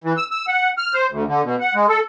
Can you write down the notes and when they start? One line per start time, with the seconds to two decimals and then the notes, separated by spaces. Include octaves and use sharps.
0.04 E3
0.17 E6
0.31 E6
0.47 F#5
0.78 F6
0.94 C5
1.10 D2
1.27 D3
1.44 B2
1.60 F#5
1.75 G#3
1.89 A4